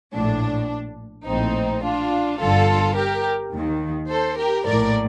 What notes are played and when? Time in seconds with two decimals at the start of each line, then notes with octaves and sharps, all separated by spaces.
0.14 A#1 A2 D4
1.27 A#1 A2 C4 D#4
1.84 D4 F4
2.40 G1 G2 D3 F4 A4
2.96 G4 A#4
3.53 D#2 D#3
4.09 A4 C5
4.37 G4 A#4
4.65 A#1 A2 A#4 D5